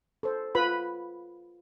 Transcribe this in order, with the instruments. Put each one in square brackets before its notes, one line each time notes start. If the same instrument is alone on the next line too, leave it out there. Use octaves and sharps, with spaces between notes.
[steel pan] A4 C5
F4 B4 B5